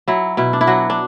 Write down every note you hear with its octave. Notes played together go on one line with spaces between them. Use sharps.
F#3 E4
B2 E4
D4
E4
F#3 F#4
D4